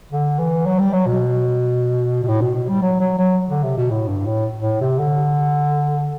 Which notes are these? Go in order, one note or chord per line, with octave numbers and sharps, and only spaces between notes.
D3
E3
F#3
G3
F#3
B2
B2
A2
B2
B2
G3
F#3
F#3
F#3
D3
C3
B2
A2
G2
A2
A2
C3
D3